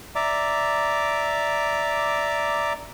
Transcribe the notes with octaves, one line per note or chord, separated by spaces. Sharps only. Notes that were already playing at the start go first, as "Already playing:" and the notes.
D5 E5 A#5 D6